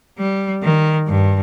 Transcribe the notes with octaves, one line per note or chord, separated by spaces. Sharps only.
G3
D#3
G2